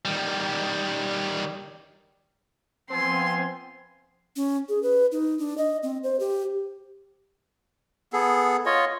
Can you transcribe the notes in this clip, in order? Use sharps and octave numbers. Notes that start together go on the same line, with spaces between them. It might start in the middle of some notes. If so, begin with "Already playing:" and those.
D#3 G3
F3 B3 C4 F4 G#5 C6
C#4
G#4
B4
D#4
D4
D#5
C4
C5
G4
B3 G#4 A4
F4 C#5 D#5